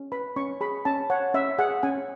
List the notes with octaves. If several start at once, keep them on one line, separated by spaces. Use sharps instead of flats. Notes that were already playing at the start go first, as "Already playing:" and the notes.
Already playing: C#4
B4 B5
C#4 C#6
G#4 B5
C#4 A5
C#5 F#5
C#4 E5
G#4 F#5
C#4 G#5